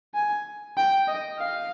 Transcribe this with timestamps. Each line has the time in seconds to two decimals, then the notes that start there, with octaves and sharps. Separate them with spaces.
0.14 G#5
0.77 G5
1.08 D#5
1.39 F5